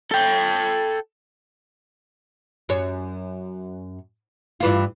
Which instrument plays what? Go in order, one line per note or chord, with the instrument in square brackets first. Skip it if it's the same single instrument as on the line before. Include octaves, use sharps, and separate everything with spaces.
[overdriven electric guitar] A4 G5
[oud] F#2 C#5
G2 E3 F4